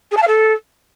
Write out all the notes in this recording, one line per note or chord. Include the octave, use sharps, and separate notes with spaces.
G#4
A5
F5
A4